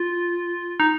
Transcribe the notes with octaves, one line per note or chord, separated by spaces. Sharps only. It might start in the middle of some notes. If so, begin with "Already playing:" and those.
Already playing: F4
D#4